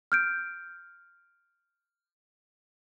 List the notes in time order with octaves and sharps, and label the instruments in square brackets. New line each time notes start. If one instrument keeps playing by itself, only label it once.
[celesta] F6 G6 D7